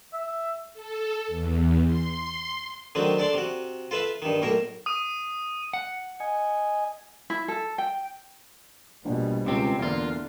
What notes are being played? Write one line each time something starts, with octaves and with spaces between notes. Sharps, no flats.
E5
A4
E2
C6
D3 D#3 F#3 A3 C4
D4 A4 D5 C6
C3 F#4
F4 A4 B4 E5 F5
G2 D#3
B1 A2 A#3 A#4
D#6 D#7
F#5
D#5 G#5
E4
A4
G5
A#1 B2 G3
C#2 C3 C4
E2 D3 A#3 F4